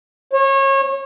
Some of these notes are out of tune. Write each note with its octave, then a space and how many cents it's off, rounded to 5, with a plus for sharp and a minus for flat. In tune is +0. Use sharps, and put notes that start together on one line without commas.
C#5 -30